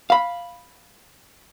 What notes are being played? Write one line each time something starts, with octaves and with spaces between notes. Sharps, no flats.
F5 B5